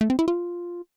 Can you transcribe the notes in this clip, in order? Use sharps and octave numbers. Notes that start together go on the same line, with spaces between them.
A3
C4
E4
F4